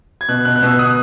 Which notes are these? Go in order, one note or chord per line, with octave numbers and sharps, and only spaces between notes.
G#6
B2 F#6
B2 F#6
F#6
B2 E6
B2 D#6